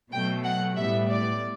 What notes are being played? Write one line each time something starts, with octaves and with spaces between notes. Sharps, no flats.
B2 F#3 A3 G5
F#5
A2 G3 B3 E5
D5